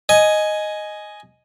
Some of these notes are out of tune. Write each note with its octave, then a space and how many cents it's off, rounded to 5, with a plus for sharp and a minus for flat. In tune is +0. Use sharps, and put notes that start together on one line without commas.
D#5 +0 G#5 +5